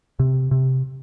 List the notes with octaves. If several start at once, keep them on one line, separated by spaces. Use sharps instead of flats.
C3
C3